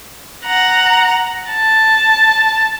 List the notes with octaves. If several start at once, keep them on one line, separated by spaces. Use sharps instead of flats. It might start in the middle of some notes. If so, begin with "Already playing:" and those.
F#5 A#5
A5